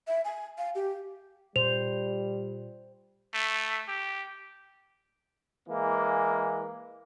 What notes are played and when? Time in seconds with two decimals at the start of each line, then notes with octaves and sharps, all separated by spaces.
0.07 E5
0.25 G#5
0.58 F5
0.75 G4
1.56 A#2 G3 C5 F7
3.34 A3
3.88 G4
5.69 E3 G#3 A#3